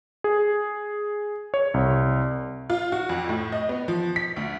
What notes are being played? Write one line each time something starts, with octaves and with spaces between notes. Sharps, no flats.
G#4
C#5
C2
F4
F#4
F2
A2
D#5
B3
F3
B6
D2